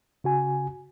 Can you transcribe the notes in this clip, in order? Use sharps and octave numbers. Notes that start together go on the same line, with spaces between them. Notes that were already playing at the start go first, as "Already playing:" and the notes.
C#3 F#4 G#5